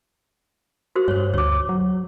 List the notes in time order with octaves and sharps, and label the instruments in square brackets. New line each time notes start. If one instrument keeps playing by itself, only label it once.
[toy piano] F#4 A#4 C5
[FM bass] G2 [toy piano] C5 C#5
[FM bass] D2 [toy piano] C#5 D6
[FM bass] F#3